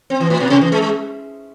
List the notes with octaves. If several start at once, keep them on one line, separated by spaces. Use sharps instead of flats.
C4
E3
A2
B2
C3
E3
G#3
G#3